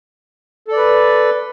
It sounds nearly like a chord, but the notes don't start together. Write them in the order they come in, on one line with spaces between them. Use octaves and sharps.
A4 D5 B4